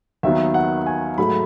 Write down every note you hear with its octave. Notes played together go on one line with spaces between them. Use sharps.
D#2 D#3 F#3 B3 E5
F#5
G#5
G#2 F#3 A3 B5